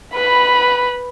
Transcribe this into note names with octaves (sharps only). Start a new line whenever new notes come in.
B4 B5